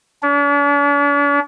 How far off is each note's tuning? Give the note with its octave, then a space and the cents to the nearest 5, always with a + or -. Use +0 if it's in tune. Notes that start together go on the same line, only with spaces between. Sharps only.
D4 -45